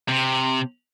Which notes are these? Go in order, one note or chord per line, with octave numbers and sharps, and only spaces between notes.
C3